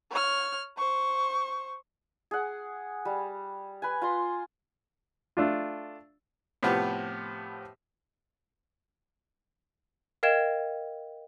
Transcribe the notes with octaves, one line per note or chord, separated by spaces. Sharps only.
C#5 F6
C5 C#6
G#4 F#5
G3
B4 G#5
F4 A#5 C6
A3 D4 F4
A2 C3 F3 B3 G4
A#4 D#5 F5 G5 G#6 E7